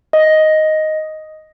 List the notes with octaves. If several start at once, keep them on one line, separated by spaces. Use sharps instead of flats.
D#5